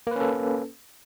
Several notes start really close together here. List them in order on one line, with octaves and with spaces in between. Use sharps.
A#3 B4 C#4 A4